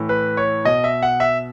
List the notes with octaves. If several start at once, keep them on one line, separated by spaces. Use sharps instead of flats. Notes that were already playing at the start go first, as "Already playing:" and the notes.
Already playing: A2 E3
B4
C#5
B2 D#5
E5
F#5
E5